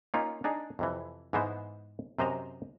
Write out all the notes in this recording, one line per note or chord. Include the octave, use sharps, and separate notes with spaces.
A#3 C#4 D#4 F4
D4 D#4 G#4
F2 C3 E3
G#2 E3 G#3 B3 C5
F#2 C3 C5 D#5 A#5